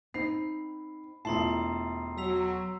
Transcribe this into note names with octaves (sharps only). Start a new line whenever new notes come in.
C4 D#4 B5 C7
E1 A3 E4 F4 A5 A#5 C6 C7
F#3 E6 B6 F7